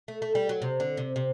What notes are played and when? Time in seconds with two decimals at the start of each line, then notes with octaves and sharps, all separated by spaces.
0.08 A3
0.22 A3
0.35 G3
0.49 F#3
0.62 C3
0.80 D3
0.97 C3
1.16 C3